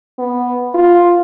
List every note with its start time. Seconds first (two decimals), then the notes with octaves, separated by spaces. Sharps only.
0.19 B3
0.75 F4